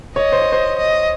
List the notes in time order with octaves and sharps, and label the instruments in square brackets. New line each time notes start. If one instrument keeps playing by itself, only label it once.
[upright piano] C#5 [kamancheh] D#5
[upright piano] C5
C#5
C5
[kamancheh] D#5